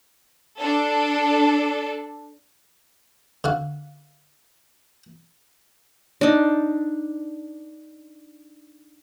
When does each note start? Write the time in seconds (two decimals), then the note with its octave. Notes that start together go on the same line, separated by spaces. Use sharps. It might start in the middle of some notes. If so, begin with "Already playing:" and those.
0.58 D4 A4
3.44 D3 F#4 F5
6.21 D4 D#4